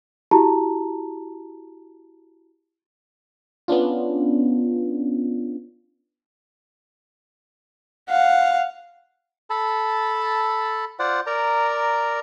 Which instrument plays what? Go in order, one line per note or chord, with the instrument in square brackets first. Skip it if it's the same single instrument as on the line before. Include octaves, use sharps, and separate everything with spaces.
[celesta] E4 F#4 G4 A5 A#5
[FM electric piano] B3 C#4 D4 F4
[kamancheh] F5 F#5
[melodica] A4 A5 B5
F4 C5 D5 F#5
A#4 D5 A#5